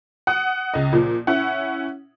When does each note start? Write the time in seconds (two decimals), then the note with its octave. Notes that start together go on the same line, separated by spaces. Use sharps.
0.27 F#5 D#6
0.74 C#2 D#5
0.93 A#2 F3
1.27 C#4 E4 F#5